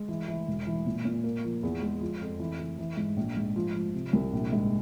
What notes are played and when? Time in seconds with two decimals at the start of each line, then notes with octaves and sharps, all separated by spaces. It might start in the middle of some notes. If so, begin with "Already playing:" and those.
Already playing: G#3
0.08 E3
0.28 E3
0.48 E1
0.67 E3
0.87 A#2
1.05 A#2
1.24 A#3
1.44 F3
1.63 E2
1.82 G#3
2.01 F3
2.21 F2
2.40 E3
2.59 E3
2.78 E3
2.97 G#2
3.16 A#1
3.37 G#2
3.56 F3
3.75 F3
3.95 C3
4.13 C2
4.33 A#1
4.52 G#2